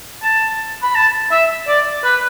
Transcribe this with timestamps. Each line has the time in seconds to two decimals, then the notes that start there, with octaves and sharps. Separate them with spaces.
0.23 A5
0.83 B5
0.95 A5
1.31 E5
1.68 D5
2.04 B4